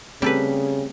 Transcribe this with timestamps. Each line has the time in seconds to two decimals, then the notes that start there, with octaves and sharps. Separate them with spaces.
0.22 C#3 G3 A3 C4 G4 A4 B4